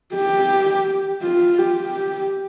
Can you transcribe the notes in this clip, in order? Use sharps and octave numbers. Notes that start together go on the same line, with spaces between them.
G4
F4
G4